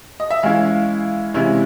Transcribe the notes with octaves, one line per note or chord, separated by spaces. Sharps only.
D#5
E5
E3 G#3 C#4 E4 F5
C3 E3 G#3 C#4 E4